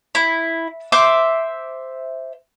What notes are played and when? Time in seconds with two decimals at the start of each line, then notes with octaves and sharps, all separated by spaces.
0.15 E4
0.92 C5 E5 D6